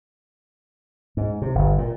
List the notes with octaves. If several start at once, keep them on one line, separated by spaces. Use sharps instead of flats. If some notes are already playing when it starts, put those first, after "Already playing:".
G#2
C3
G1
A#2